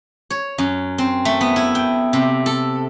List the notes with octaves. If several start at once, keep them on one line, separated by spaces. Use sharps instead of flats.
C#5
F#2
C4
A3
B3
E4
G5
C3
A4